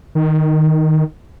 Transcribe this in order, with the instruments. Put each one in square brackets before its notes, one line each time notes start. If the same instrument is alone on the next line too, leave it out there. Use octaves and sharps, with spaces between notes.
[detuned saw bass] D#3